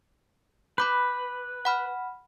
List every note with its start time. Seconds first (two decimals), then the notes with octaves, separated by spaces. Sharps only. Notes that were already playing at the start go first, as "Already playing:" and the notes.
0.78 B4 B5 D6 G6
1.65 F#5 B5 F6